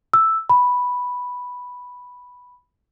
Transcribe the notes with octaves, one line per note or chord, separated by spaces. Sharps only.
E6
B5